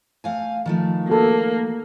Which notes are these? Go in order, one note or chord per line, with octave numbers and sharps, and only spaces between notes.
A3 F5 G#5
D#3 F3 A3
A#3 F#4 A4